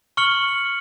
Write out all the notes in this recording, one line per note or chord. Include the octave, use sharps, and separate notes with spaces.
C#6 F6 C#7 F#7